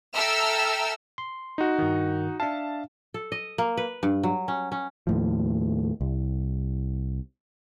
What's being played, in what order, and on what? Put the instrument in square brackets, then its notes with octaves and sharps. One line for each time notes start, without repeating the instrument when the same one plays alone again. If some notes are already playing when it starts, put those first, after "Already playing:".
[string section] A4 E5 G5 A#5 E6 F6
[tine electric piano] C6
[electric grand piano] D#4 F#4
[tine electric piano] G2 D#3
[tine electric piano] D4 E5 F5 [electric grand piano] A5
[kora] A4
D#5
A#3
B4
G2
F#3
C#4
C#4
[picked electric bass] D#2 A2 F3
C2